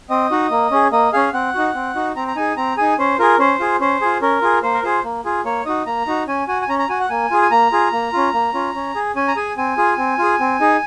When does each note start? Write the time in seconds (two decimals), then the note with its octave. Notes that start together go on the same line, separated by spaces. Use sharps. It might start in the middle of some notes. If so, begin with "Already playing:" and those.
0.10 C4 D#5
0.31 D#4 F#4
0.51 A#3
0.71 C#4 G#4
0.92 A#3 D#5
1.13 C#4 G#4 F5
1.33 C4 F#5
1.54 D#4 F#4
1.75 C4
1.95 D#4 F#4
2.16 C4 A#5
2.28 A#5
2.36 D#4 G#4 G#5
2.57 C4 A#5
2.77 D#4 G#4 G#5
2.99 C#4 C5
3.19 F4 G#4 A#4
3.39 C#4 C5
3.60 F4 G#4
3.80 C#4 C5
4.01 F4 G#4
4.22 C#4 A#4
4.42 F4 G#4
4.63 A#3 C5
4.74 A#4
4.83 F4 G#4 C5
5.04 A#3
5.25 F4 G#4
5.45 A#3 C#5
5.66 D#4 F#4 D#5
5.86 A#3 A#5
6.07 D#4 F#4
6.27 C#4 G#5
6.48 F#4 G#5
6.62 G#5
6.69 C#4 A#5
6.79 A#5
6.89 F#4 G#5
7.00 F#5
7.10 A#3 G#5
7.31 F4 G#4
7.42 G#5
7.51 A#3 A#5
7.72 F4 G#4
7.93 A#3
8.13 C#4 F4
8.34 A#3
8.54 C#4 F4
8.75 C#4
8.95 G#4
9.16 C#4 G#5
9.28 A#5
9.36 G#4 G#5
9.57 C4 G#5
9.78 F4 G#4
9.98 C4
10.18 F4 G#4
10.40 C4
10.60 D#4 G#4